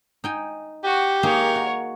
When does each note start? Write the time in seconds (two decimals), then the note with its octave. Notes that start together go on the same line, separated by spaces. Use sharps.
0.24 D#4 G5 G#5
0.84 F#4 G4
1.23 A#3 D#4 G#4 A#4 C#5
1.55 F#4